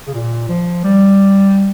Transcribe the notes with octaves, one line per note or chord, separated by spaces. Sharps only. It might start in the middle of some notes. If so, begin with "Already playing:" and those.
C#3
A#2
F3
G3